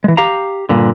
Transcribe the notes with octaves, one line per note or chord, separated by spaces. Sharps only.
E3 G#3
G4 F5 A#5
G2 A#2 D3